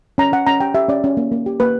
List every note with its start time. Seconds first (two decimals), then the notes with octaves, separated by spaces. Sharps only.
0.18 C#4 A#5
0.32 C#4 F#5
0.47 C#4 A#5
0.60 G4 G5
0.75 G4 E5
0.89 C#4 D5
1.04 C#4
1.17 A#3
1.32 A#3
1.46 G4
1.60 A#3 B4